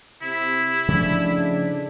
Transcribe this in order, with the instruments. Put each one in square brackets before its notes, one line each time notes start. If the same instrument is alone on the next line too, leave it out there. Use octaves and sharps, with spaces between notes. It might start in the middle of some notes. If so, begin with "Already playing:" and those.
[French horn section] C3 [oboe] E4
[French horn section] A2 G#3 D4 [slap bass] C#3 F3 A3